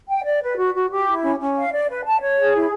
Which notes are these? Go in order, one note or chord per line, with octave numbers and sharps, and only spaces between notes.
G5
D5
B4
F#4
F#4
G4
E4
C#4
C#4
F5
D5
B4
A5
C#5
G#4
E4